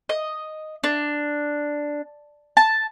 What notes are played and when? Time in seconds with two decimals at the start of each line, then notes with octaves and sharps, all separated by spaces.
0.09 D#5
0.84 D4
2.57 A5